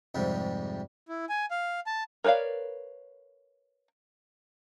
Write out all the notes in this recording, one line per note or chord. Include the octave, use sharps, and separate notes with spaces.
F2 G#2 C3 G3
E4
G#5
F5
A5
A#4 B4 C#5 D5 F5